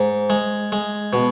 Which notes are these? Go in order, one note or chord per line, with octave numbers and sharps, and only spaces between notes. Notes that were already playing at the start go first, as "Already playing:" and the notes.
Already playing: G#2
G#3
G#3
B2